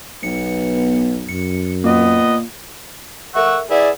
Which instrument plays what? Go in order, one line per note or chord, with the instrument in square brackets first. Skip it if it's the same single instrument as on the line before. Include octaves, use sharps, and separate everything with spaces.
[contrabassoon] B1 [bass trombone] B3 [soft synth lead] C#7
[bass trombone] F#2 [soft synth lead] C#7
[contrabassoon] A#2 [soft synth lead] A#3 [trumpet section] B3 D#5
[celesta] A4 A#4 E5 [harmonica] F#5 C#6 E6
[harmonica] E4 G#4 [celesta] B4 F#5 [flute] D5